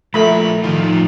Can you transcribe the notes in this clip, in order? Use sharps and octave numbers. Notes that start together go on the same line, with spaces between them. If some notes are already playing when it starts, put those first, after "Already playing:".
F3 A3 F4 A#4 B5
A2 D#3 F3 F4